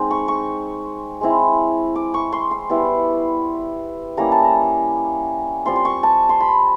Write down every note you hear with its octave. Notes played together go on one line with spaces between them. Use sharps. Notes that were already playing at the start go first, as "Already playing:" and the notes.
Already playing: G#3 C4 D#4
C#6
C#6
G#3 C4 E4
D6
C#6
C6
C6
G3 B3 E4
G3 A#3 C#4 E4 A#5
A5
A#5
G3 C4 F4 C6
C6
C#6
A5
C6
B5